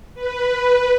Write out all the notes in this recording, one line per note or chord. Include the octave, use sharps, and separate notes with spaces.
B4